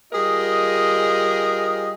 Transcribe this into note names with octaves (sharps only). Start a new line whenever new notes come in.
G3 F4 G#4 A#4 D#5